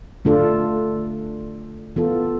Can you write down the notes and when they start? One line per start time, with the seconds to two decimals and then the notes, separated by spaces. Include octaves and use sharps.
0.25 D3 A3 D4 F4 A4
1.96 E3 B3 F4 A4